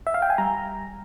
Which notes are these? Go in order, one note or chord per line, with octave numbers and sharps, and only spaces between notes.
E5
F5
G5
G#5
G3 A#5